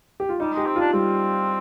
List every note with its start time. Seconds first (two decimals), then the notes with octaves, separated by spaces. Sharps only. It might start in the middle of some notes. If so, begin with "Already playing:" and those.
0.20 G4
0.29 F4
0.40 G3 D#4
0.54 G#3 G4
0.66 C4
0.76 D4 F4
0.93 G3 C4